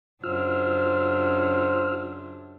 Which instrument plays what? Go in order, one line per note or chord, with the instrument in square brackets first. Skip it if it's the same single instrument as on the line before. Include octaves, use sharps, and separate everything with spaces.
[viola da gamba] F#2 C#3 D4 [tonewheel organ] F4 E6 F6 [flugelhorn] C5